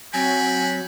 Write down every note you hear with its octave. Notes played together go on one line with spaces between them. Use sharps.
F#3 C4 F#4 G5 G#5 B5